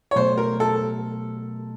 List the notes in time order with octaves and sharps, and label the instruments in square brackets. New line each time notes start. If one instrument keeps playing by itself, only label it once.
[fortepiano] C#5
[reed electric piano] B2 F#3 A3 [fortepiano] C5
[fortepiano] A#4
A4